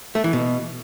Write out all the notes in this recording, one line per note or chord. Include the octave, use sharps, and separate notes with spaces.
A3
E3
B2